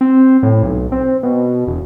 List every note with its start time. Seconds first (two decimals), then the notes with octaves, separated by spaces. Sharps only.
0.01 C4
0.43 A2
0.63 B1
0.92 C4
1.23 B2
1.67 E1